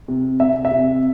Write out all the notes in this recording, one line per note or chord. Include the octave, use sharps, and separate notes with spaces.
C3
C3 E5
E5
C3